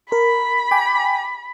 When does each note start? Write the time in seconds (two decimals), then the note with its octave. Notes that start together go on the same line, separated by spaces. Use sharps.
0.12 A#4 B5
0.71 G5 G#5 D6